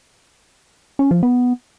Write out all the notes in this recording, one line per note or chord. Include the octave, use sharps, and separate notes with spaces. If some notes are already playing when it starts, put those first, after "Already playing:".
C#4
F3
B3